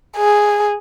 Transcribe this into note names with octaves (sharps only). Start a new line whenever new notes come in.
G#4